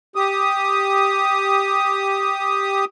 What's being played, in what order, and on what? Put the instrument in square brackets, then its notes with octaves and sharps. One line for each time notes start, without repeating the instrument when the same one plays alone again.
[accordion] G4 D#6